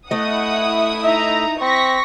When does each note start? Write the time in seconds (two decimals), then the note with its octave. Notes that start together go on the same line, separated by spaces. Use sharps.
0.11 A3 E4 D#5 F#5 D#6
1.04 D#4 E5 A#5
1.61 C4 C#6 A#6 B6